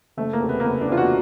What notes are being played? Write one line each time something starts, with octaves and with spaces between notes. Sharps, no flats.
F#1 A3
A#3
E2 C3
B3
A#3
F#1 B3
D4
E2 C3 F4
F#4